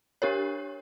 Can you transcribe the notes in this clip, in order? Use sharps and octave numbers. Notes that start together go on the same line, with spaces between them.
D4 G4 A#4 C#5